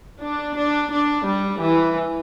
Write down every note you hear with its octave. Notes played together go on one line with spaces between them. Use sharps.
D4
D4
D4
G3
E3